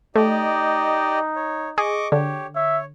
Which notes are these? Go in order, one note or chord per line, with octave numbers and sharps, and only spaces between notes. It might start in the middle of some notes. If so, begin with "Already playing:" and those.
A3 D#4 G4 D5 D#5
C#5
G#4 D#5 C#6 D6
D3 G4 C#5
C#5 E5